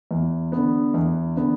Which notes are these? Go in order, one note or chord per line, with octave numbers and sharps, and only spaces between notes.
E2
D3 B3
E2
D3 B3